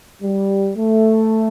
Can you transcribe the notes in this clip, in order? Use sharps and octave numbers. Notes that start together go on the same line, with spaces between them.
G3
A3